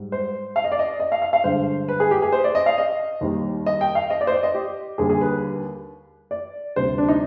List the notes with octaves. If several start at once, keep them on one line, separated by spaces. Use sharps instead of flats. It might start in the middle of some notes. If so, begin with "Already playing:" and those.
Already playing: G#2 G3
C5
F5
D#5
D5
D#5
D#5
F5
F5
F5
G2 D3 G#3 C5
B4
G#4
G4
G#4
C5
D5
D#5
F5
D#5
D#2 D#3 G3
D#5
G5
F5
D#5
D5
C5
D5
D#5
G4
D#2 D3 G3 G#4
G#4
B4
D5
D2 C3 G3 C5
D4
D#4